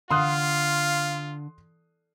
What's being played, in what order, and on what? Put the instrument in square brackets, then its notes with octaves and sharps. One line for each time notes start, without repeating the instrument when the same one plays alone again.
[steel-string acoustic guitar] D3 [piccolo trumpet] F4 [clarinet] F5 [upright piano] C6 D#6 F#6